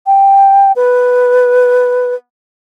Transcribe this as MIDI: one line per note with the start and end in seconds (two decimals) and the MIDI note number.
0.06 0.72 79
0.76 2.15 71